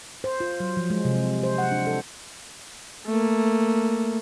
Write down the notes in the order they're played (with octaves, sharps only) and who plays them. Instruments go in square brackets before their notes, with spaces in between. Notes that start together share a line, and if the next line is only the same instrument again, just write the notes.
[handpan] C5
F4
F#3
F3
G#3
C3
C5
F#5
D4
A4
[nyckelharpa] A3 A#3